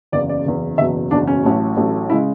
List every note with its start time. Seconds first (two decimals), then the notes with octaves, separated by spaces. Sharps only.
0.12 F#1 E2 C#3 D5
0.29 D5
0.46 F#1 E2 C#3
0.78 F#1 E2 B2 F#3 E5
1.11 F#1 E2 B2 F#3 D4
1.27 C#4
1.44 A1 A2 F#3 A3
1.77 A1 A2 F#3 A3
2.10 C#3 G#3 E4